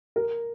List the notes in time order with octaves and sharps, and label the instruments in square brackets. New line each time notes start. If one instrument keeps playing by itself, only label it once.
[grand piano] A#4